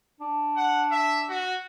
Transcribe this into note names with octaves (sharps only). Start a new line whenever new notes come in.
D4
F#5
E5
F#4